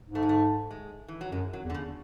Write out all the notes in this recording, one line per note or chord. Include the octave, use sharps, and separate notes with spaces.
G#2
A3
G#3
A3
G#3
E3
F#3
F#2 G#3
F#3
E2
D3
C#3